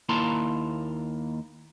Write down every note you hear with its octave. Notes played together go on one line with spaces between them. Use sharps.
D#2 A#3 E4 A5 A#5 C6